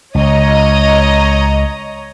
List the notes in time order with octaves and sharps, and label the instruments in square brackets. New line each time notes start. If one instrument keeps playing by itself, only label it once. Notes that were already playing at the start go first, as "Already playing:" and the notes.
[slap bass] C#2 [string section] C#5 D#5 A#5